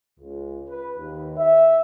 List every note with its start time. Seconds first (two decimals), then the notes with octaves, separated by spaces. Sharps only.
0.20 C#2
0.68 B4
0.97 D#2
1.37 E5